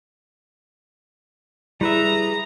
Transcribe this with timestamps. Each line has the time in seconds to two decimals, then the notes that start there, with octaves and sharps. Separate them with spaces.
1.81 G3 E4 G#4 B4 E5 A#5